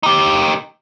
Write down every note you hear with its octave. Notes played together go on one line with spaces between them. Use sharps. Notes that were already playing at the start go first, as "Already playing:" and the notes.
D#4 G4